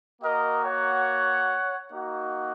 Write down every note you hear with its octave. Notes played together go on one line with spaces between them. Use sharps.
A#3 F#4 A#4 D#5
C#5 F#5
A#3 D#4 F#4